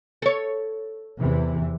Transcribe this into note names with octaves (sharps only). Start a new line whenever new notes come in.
A4 C#5
E2 C3 E3